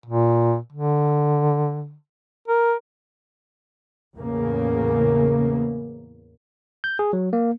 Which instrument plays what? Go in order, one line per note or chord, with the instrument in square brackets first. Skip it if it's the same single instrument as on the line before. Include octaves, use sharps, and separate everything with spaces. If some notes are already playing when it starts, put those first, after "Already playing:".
[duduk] A#2
D3
A#4
[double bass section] E2 A2 C#3 A#3
[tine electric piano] G6
G#4
F#3
A#3